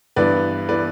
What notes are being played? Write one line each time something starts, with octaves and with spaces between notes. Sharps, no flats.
G2 E3 B3 B4 D5
E3 B3 B4 D5